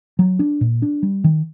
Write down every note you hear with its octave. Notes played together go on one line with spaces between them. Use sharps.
F#3
D4
A#2
D4
G3
D#3